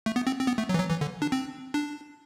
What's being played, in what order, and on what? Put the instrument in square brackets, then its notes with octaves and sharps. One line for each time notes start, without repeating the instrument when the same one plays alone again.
[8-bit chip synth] A3
B3
C4
C4
B3
A3
F#3
E3
F#3
E3
D3
D4
C4
D4